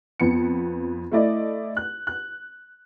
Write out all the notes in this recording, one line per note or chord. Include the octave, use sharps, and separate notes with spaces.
F2 B3 C#7
A3 E4 D5 D#5
F#6
F#6